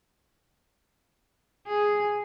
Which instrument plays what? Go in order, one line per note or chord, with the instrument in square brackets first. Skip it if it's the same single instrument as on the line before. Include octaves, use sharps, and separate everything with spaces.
[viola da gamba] G#4